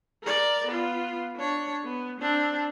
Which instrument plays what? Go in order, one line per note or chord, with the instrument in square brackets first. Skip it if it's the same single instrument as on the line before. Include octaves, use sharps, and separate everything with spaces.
[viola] A#4 D5
B3 F4
D4 C#5
B3
C4 D4